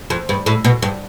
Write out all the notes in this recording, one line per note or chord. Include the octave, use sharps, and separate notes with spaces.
F2
G2
A2
B2
G2